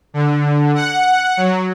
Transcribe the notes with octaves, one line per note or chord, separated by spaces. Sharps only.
D3
F#5
F#3